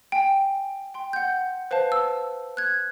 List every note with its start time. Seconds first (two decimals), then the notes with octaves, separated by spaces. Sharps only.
0.12 G5 G#5
0.94 G5 C6
1.13 F#5 G6
1.71 B4 C5 F5 A5
1.92 E6
2.57 F#6 G#6